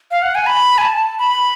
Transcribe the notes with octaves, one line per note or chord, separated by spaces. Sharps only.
F5
F#5
G#5
B5
G#5
A5
B5